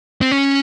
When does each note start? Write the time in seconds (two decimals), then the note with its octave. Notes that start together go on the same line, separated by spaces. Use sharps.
0.21 C4
0.31 C#4